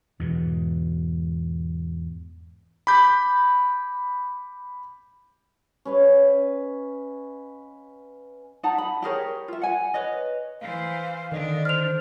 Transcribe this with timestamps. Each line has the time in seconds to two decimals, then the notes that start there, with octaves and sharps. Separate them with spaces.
0.19 E2 G#2 B2
2.87 B5 D6 G6 B6
5.85 C#4 B4 D#5 F5
8.63 D#4 F#5 A5 A#5
8.78 B5
9.02 G4 G#4 A#4 C#5
9.48 F4 E5
9.61 F#5 G#5
9.94 B4 C#5 D#5
10.61 E3 C5 F5
11.32 D3 D#3 D4 D#5
11.65 C5 F6 F7